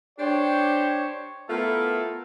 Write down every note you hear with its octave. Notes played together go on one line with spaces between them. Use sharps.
D4 G4 C5 C#5
A3 B3 E4 F4 A4 A#4